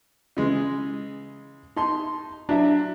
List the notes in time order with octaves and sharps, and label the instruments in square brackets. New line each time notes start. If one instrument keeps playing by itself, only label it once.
[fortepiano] C#3 E3 G#3
D#4 A5 C6
[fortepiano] F#3 E4 E5 [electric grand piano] D4